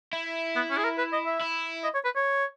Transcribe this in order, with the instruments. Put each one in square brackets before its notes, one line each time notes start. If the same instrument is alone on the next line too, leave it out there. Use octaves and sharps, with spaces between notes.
[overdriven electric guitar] E4
[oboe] B3
C#4
G#4
A#4
B4
D#5
E5
[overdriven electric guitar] E4
[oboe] D#5
C#5
B4
C#5